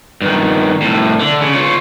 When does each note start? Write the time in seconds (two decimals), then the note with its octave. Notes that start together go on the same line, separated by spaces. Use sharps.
0.22 G2 D#3
0.81 C2 A2
1.20 D3
1.41 C#3
1.54 F4 C#5